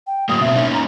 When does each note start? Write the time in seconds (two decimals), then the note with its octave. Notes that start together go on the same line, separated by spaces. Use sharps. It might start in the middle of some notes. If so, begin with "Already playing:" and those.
0.07 G5
0.29 A2 F#3 A#3 D#6
0.41 B2 A#3 C4 E5
0.55 A#3 C#4 D#4
0.73 A#5